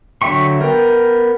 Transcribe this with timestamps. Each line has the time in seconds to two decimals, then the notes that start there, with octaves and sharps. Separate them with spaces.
0.22 D3 F#3 E5 G5 C#6
0.60 B3 A#4 G5